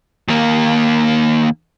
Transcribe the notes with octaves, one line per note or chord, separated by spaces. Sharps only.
D#2 A#3